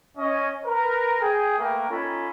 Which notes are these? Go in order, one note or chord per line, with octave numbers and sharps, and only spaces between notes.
C#4 D#5
A#4 B4
G#4 G5
A3 A#3 A#4 B4 G5
C#4 D#4 F4 A4 G#5 B5